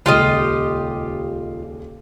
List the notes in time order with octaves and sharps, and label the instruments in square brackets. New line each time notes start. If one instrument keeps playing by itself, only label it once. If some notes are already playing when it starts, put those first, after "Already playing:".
[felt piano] D#1 C#2 [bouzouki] F4 G4 D#5